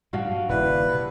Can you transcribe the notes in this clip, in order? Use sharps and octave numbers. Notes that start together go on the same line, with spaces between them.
G2 A#2 G3 F#4 F5 A5
G2
D#1 C#3 E4 B4 D5 F5
C3